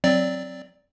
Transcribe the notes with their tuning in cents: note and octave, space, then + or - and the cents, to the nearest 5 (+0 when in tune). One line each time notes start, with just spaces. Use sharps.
F#3 +0 C4 +0 D5 +0